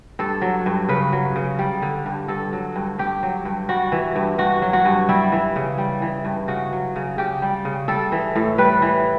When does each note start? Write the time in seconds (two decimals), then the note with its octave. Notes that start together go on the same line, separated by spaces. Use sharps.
0.19 G2 A4
0.42 F#3
0.66 G2
0.89 C#3 B4
1.12 F#3
1.36 C#3
1.59 G3
1.82 D3
2.06 G2
2.28 G2 A4
2.53 F#3
2.76 G2
2.98 G2 G4
3.23 F#3
3.45 G2
3.69 G3 F#4
3.92 E3
4.16 G2
4.38 G2 F#4
4.62 F#3
4.73 F#4
4.85 G2
5.09 G3 E4
5.32 E3
5.56 C#3
5.78 G3
6.02 E3
6.25 G2
6.48 C#3 F#4
6.72 F#3
6.96 C#3
7.18 C#3 G4
7.42 G3
7.65 C#3
7.88 G3 A4
8.12 E3
8.36 A2
8.58 G3 B4
8.82 E3